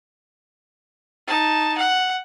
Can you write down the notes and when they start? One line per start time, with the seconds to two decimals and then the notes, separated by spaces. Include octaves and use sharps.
1.27 D#4 A5
1.78 F#5